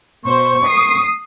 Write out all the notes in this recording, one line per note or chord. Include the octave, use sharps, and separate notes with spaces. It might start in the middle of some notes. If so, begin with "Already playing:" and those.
B2 C5 C#6
D#6 C7